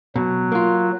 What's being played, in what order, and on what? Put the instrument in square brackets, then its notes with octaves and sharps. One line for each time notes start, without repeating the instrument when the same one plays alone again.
[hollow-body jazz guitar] B2 [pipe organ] F#3
[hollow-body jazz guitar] A#3 F4